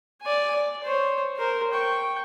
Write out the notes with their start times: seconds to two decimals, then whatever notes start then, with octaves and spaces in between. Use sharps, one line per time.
0.22 D5 G#5
0.54 D5
0.83 C5 C#5
1.37 A#4 C5
1.72 G5 C#6